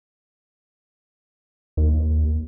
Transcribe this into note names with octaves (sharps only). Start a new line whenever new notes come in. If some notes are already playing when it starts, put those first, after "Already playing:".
D#2